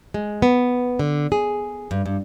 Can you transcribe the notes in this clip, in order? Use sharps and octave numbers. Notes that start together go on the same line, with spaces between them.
G#3
B3
D3
G#4
G2
G2